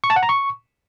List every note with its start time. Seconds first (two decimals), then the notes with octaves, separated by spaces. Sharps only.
0.04 C#6
0.10 A5
0.16 F#5
0.23 A#5
0.29 C#6